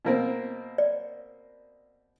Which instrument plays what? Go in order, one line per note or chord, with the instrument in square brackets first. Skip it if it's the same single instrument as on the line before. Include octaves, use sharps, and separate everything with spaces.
[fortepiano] B2 A#3 C4
[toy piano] D5